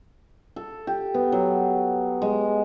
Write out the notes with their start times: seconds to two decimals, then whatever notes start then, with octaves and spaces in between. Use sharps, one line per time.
0.56 A4
0.87 G4
1.14 B3
1.32 F#3
2.22 G#3